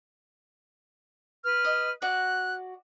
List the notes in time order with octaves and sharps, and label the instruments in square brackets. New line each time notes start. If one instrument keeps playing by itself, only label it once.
[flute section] B4 F6
[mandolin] D#5
[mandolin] F#4 D5 [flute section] F#6